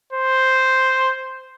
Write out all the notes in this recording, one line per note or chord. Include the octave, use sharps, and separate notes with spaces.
C5